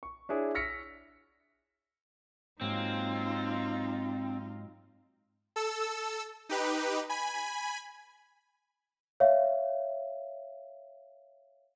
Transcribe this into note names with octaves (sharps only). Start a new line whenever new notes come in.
C#6
D4 E4 G#4 C#5
C#6 E6 F6 A#6 B6 C#7
G#2 F#3 A#3 C4 D#4 F4
A4 E6
D#4 G4 B4
G#5 B5
C#5 E5 F5